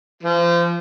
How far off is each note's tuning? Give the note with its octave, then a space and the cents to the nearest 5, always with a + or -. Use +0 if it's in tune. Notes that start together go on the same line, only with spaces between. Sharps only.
F3 -30